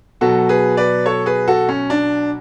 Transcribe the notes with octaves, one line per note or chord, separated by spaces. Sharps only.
B2 F#3 F#4 A4
G#4 B4
B4 D5
A4 C#5
G#4 B4
F#4 A4
C#4
D4